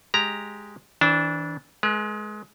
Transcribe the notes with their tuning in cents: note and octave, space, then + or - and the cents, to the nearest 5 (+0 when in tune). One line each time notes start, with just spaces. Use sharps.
G#3 +0 G4 +0 A#5 +0
E3 -30 D4 -15 C5 +0
G#3 +25 B4 -45